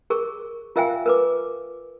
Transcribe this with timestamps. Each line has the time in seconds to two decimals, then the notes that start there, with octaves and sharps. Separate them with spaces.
0.10 G#4 A#4 C#6
0.76 F4 A#4 E5 F5 G5 G#5
1.06 A#4 B4 D6